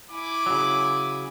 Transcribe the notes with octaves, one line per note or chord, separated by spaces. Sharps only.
E4 G#5 D6
C#3 F#3